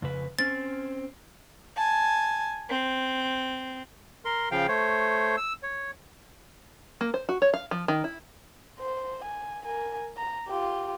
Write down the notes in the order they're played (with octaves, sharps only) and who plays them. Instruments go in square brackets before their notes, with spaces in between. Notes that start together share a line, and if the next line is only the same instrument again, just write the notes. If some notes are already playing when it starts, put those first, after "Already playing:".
[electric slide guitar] F2 C#3 B4
[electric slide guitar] C4 C#4 [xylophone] A6
[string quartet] G#5 A5
C4
[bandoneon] A#4 C6
C#3 F3 F5 G5
A3 C5 C#5
E6
C#5
[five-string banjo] A#3
C5
F#4
C#5
F5
F3
D#3
E4
[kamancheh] C5
G#5
A#4 G#5
A#5
F4 G4